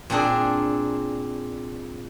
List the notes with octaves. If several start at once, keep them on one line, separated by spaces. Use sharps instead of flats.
A#2 C4 D4 G#4